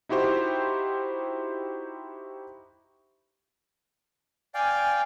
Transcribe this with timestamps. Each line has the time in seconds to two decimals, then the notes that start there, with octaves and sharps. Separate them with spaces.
0.09 D#4 E4 F#4 G4 C5
4.54 D5 F5 G5 G#5